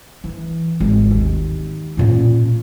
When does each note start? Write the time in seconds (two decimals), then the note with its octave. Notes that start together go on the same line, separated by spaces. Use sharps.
0.24 E3
0.80 G#1
1.11 D#2
1.97 A#2 C#4